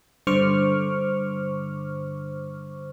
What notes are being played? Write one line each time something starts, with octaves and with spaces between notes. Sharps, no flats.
G2 D3 C5 C#6 D6 F6